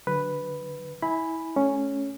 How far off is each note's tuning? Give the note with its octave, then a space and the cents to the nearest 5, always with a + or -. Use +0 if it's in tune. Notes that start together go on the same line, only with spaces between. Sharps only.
D3 +0 F#3 +0 B4 +0
E4 -25 G#5 +0 B5 +0
A3 -25 C#4 +0